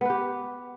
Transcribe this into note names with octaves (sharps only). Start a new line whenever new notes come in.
B3 G4 B4